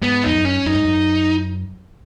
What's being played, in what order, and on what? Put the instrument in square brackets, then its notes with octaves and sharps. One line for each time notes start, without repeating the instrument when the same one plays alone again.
[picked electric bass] G#2 [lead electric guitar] B3
[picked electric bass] F2 [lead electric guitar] D#4
[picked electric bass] F#2
[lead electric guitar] C#4
[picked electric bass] F#2 [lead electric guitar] D#4
[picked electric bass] G#2
F#2